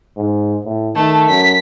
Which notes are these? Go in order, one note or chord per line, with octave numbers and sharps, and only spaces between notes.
G#2
A2
D#3 A3 A5
F#2 B6